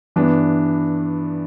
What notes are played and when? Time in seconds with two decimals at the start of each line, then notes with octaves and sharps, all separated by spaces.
0.16 G2 E3 B3 D4